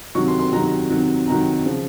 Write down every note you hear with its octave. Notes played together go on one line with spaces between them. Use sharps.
C3 D#3 F#3 C#6
C6
C6
C3 D#3 F#3 A#5
C3 D#3 F#3
C3 D#3 F#3 A#5
C#3 F3